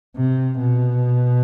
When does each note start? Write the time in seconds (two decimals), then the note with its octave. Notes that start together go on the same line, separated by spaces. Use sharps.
0.16 C3
0.59 B2